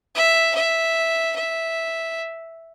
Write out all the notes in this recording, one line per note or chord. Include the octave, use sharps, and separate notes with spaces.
E5
E5
E5